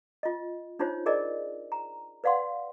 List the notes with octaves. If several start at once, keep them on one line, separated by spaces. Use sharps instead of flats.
F4 D#5
D4 D#4 F4 C5 C#5
G#4 A#4 D5 D#5 G#5
A#5
B4 D5 F5 F#5 C6